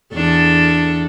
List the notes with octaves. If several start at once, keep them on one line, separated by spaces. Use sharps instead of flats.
E2 D4 A4